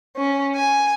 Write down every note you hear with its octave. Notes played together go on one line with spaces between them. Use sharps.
C#4
G#5